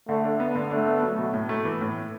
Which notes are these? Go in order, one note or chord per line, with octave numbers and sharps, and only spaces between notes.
D3 A3
D4
B3
D3
A3 D4
B3
F#3
B2
A2
A3
E3
A2